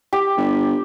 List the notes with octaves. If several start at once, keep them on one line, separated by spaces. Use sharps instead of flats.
G4
G1